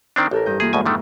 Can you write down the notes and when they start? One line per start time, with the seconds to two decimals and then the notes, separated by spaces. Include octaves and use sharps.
0.16 D#3 C4 D4
0.31 A1 G4 A4 A#4
0.46 G2 D#5 G6
0.60 E3 A#3 F4 G#4
0.73 D2 G#2 B2 G#5
0.86 F2 D3 D#3 A3